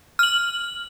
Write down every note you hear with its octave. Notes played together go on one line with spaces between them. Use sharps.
F6 F#7